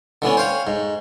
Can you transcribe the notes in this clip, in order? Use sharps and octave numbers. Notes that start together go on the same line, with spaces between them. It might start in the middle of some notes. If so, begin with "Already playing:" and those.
D3 E3 B3 C#4
C5 C#5 F5 G5
G#2